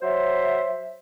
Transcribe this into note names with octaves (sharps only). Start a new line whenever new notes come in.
F#3 C5 E5